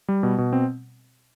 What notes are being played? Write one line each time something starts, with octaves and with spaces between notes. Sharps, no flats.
G3
B2
B2
C4